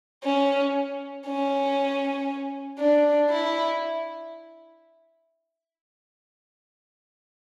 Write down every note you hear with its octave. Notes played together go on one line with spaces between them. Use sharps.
C#4
C#4
D4
E4